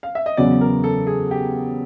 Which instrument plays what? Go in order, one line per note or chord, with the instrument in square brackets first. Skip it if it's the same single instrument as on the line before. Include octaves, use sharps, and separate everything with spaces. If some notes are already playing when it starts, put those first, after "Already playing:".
[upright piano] F5
E5
D#5
[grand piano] E2 C#3 F#3 B3 [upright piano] D5
[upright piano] A#4
A4
G#4
G4